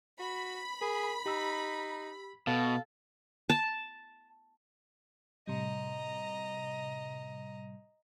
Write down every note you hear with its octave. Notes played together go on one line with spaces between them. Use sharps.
F#4 B5
G#4 A#4
D#4 G4 E6
B2 A4 F5
A5
A2 C3 G3 D#5 A#5